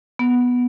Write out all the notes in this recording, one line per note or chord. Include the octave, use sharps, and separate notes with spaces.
B3